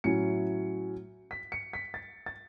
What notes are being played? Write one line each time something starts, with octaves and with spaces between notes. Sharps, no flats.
A2 F#3 C#4 E4 C#7
B6
C#7
B6
A6
A6